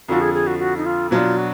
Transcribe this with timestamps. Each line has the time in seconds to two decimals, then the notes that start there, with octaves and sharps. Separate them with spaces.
0.08 F2 D3 F3 F#4
0.21 G#4
0.34 G#4
0.47 F#4
0.59 F#4
0.77 D#4
0.85 F4
1.11 B2 F#3 D4 F4
1.37 F#4